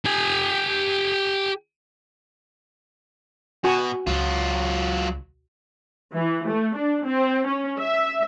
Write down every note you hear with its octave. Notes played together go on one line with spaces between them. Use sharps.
G4 G#5
B2 F#4 G#5 C#6
C#2 F#3 F4
E3
A3
D4
C4
C#4
E5